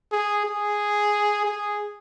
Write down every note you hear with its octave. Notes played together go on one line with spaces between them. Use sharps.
G#4
G#4
G#4